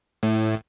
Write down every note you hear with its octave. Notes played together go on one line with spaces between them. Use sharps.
A2